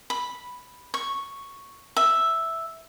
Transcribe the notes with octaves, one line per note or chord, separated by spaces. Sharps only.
B5
C#6
E5